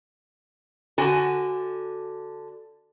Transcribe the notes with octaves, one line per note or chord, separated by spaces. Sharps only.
D3 F#4 G#5 A5